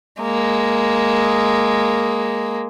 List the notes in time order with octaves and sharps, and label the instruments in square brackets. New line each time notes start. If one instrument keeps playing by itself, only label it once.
[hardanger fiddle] G#3 A#3